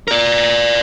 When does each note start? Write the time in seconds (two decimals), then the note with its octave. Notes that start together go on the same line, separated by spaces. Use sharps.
0.08 A#4 D5